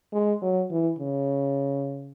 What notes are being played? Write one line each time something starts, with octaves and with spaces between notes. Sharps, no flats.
G#3
F#3
E3
C#3